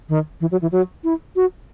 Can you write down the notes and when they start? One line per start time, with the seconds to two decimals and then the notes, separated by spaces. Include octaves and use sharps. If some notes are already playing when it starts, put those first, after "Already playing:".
0.09 D#3
0.41 E3
0.51 F#3
0.62 E3
0.72 F#3
1.04 E4
1.36 F#4